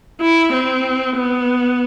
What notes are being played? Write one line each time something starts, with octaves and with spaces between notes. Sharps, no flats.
E4
C4
B3